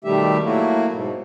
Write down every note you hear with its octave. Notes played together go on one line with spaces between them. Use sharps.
B2 D#3 G3 A3 G4 E5
F#3 A3 A#3 E4 F#4
G#2 B2